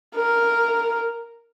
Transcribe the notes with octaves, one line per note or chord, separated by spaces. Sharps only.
A#4